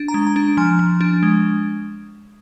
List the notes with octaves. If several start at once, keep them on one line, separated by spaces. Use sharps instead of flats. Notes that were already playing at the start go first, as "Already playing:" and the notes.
Already playing: D4
A#5
G#3
A#5
D4
F3 G#5
F3
D4
G#3